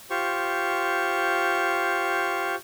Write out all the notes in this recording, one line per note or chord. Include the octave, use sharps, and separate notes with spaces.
F4 G4 C5 C#6